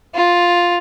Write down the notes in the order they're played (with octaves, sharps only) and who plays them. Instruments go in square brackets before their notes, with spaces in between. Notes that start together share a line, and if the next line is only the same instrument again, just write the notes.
[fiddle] F4